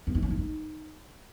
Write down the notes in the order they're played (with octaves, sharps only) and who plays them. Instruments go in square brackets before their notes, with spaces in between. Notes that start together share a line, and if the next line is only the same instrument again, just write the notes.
[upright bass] B3
E4
C#4
E4
D#4